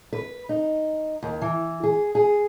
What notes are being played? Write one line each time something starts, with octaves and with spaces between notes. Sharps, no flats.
B4
D#4
D#2
E3
G#4
G#4